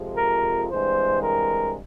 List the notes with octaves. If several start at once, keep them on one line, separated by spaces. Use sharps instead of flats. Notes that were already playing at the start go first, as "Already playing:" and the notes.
Already playing: F2 C3 F3 G#3
A#4
G2 E3 G#3 C4 C5
A#4